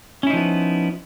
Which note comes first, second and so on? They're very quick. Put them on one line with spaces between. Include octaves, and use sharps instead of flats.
C#4 E4 D#4 F3 B3